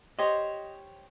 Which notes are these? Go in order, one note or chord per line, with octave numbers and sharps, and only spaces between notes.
G4 C5 C#5 D#5